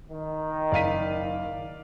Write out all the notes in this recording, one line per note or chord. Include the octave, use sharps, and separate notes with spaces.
D#3
F#1 D5 F5 B6 D#7